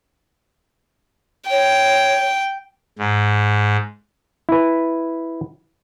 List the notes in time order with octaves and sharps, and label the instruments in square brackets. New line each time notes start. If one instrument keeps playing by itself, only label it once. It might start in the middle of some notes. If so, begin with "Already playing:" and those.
[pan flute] C#5 [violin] G5
[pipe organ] G#2
[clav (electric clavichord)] E4 B4